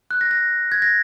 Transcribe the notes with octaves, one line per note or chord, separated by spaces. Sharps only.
F#6
A#6
A#6
G#6
A#6